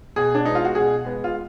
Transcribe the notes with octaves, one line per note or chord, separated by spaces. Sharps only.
B2 G#4
D4
G#3 B3 D#4
F4
F#4
B2 G#4
G#3 B3
F4